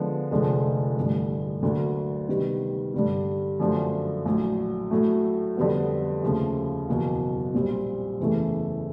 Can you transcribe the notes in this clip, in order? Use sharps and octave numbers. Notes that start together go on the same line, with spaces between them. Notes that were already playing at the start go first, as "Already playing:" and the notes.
Already playing: D3 F3 G#3 B3
F1 F2 D3 F3 G#3
A1 G2 D3
D2 D3 F#3 A#3
C3 D#3 G3 B3
G2 D3 G3
F#2 D3 F3 A3
A#1 A2 F#3
A2 F#3 A3
F2 D3 G3 B3
D#2 C#3 F3 A3
F#1 E2 B2 F#3 A#3
A#1 A#2 G3 C4
F#1 E2 C#3 E3 A3